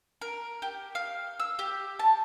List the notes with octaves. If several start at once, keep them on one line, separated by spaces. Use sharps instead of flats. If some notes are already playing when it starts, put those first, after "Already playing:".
A#4
G4
F5
E6
G4
A5